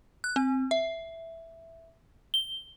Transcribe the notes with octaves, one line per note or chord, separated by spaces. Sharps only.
F#6
C4
E5
G7